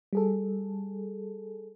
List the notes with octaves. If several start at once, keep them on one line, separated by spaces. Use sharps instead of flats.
G3 G#4 A4